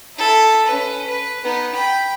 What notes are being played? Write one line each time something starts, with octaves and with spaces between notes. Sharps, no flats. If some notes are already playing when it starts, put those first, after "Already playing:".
E4 A4
C#4 B4
B4
B3 D#4
G5 B5